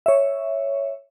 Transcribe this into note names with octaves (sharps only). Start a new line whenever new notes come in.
C#5 E5